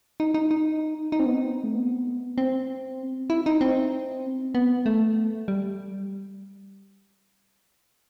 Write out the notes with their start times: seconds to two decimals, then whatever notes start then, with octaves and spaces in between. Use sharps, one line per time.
0.20 D#4
0.34 D#4
0.51 D#4
1.12 D#4
1.20 C4
1.26 B3
1.34 C4
1.64 A3
1.75 B3
2.38 C4
3.30 E4
3.46 D#4
3.61 C4
4.55 B3
4.86 A3
5.48 G3